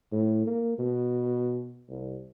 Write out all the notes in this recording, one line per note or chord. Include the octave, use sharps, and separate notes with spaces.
A2
A#3
B2
C2